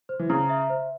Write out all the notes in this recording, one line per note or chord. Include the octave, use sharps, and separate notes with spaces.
C5
E3
C#3 A#5
E5
C5